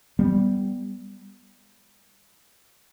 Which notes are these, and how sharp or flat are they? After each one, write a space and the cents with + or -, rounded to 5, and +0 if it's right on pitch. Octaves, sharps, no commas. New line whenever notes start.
G3 +0 B3 +0